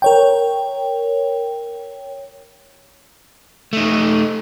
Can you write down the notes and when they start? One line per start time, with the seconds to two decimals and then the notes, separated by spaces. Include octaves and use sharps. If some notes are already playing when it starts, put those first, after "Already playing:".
0.02 A#4 C#5 G5
3.73 A3 D#4